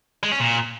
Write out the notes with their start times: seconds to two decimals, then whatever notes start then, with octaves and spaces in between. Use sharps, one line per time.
0.23 G#3
0.32 C#4
0.40 A#2